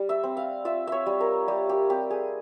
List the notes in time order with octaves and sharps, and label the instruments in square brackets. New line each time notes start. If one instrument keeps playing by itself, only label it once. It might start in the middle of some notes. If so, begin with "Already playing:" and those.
Already playing: [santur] G3
E5
C4
F5
F4 E5
C#5 E5
G3
A#4
G3 G4
G4
C4 G4
G#4